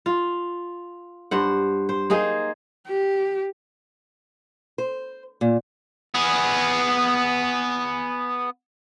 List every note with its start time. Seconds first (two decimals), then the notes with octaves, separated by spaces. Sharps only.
0.06 F4
1.31 G2 C5 F#5
1.89 C5
2.10 A#3 D#4 G#4 C5
2.87 G4
4.78 C5
5.41 A#2
6.15 B3 G#4